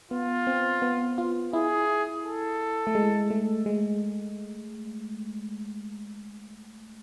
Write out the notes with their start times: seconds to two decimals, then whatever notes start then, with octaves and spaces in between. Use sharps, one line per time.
0.11 B3 F4
0.47 C4
0.82 B3
1.18 F4
1.53 E4 G#4
2.25 A4
2.87 A3
2.95 G#3
3.30 A3
3.66 G#3